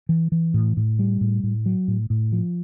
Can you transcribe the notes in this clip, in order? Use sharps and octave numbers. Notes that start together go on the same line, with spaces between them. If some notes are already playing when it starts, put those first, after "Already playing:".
E3
E3
A2
A2
G3
A2
A2
F#3
A2
A2
F3